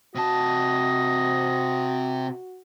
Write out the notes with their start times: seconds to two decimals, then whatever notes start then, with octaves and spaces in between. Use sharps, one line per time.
0.15 C3 F#4 D#5 A5